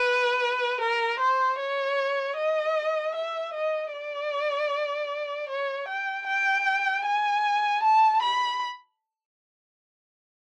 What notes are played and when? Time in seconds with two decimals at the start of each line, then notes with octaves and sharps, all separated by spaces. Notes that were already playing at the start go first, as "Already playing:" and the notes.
Already playing: B4
0.81 A#4
1.19 C5
1.58 C#5
2.37 D#5
3.15 E5
3.53 D#5
3.93 D5
5.49 C#5
5.88 G5
6.27 G5
7.05 G#5
7.83 A5
8.22 B5